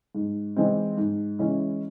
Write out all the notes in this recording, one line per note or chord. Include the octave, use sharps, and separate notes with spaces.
G#2
E3 G#3 C4 D#4
G#2
E3 G#3 C#4 E4